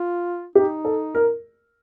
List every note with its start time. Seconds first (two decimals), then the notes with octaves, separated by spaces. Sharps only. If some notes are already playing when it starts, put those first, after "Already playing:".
Already playing: F4
0.55 D#4 G4
0.85 A4
1.15 A#4